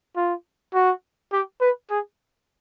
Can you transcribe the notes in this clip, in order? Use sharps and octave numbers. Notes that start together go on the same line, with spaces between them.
F4
F#4
G4
B4
G#4